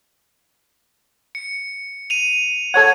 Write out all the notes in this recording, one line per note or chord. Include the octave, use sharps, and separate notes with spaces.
C#7
D#7 F7
A4 C#5 F#5 G#6